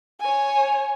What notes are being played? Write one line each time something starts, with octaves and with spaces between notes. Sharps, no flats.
C#5 G#5